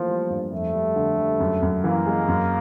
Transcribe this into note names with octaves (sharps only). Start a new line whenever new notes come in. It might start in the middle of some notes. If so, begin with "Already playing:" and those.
Already playing: E3 F3 A3 A#3
G3
G2
F2 A3
G3
D3
G3
F#2
F#2
E3 A#3
G#3
F#2